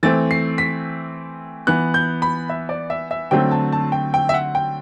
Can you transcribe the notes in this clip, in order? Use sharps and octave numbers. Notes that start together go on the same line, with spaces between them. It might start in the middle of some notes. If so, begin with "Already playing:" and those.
E3 A3 C4 A6
C7
B6
E3 B3 F#6
G6
B5
E5
D5
E5
E5
D3 F#3 A3 C4 G5
A5
A5
G5
G5
E5
F#5
G5